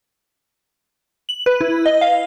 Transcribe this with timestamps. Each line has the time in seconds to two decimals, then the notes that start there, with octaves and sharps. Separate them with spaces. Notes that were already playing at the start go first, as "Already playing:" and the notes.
1.29 F#7
1.46 B4
1.61 E4
1.86 D#5
2.01 F5